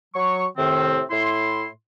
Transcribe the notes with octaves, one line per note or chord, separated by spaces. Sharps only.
F#3 C#6
A2 C3 D#3 C4
A2 E4 C6